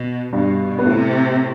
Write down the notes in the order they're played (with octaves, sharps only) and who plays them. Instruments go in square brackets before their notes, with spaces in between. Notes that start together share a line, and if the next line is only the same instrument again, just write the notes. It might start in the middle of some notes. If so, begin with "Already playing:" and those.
Already playing: [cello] B2
[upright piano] G2 G3 [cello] B2
[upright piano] B3
[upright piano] A2 A3 [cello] C3